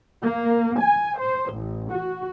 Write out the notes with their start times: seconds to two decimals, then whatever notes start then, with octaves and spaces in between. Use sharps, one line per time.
0.23 A#3
0.80 G#5
1.19 C5
1.52 A1
1.92 F#4